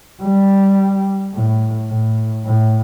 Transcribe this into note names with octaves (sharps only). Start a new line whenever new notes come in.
G3
A2
A2
A2